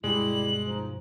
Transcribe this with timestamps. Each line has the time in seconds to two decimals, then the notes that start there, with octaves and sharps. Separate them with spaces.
0.04 G2 B2 G3 G#3 E4 F#7
0.66 F3 D#4